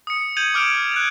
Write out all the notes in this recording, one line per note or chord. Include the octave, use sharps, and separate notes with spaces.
D#6 C#7
G6 G#6 D#7 F7 F#7
D6 F6 D7 F7
F#6 G#6 F7